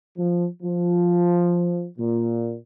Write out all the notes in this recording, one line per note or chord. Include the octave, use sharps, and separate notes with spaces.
F3
F3
A#2